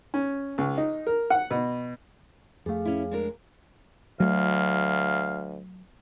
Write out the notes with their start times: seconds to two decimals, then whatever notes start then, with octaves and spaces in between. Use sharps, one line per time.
0.14 C#4
0.58 C#2
0.78 D#4
1.07 A#4
1.30 F#5
1.51 B2
2.66 F2 A3 G#4 F5
2.85 C#4 E4
3.11 G#3 D4 A#4
4.20 D2 F#3 A3 F5